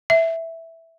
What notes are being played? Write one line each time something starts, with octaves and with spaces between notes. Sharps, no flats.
E5